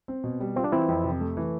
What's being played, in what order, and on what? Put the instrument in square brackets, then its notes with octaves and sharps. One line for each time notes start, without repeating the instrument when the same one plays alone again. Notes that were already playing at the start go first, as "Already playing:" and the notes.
[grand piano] C4
B2
G3
[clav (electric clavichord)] C4 [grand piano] F4
[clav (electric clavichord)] D4
[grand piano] E3 [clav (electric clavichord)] C4 E4
[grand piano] F2
C3
A3
E3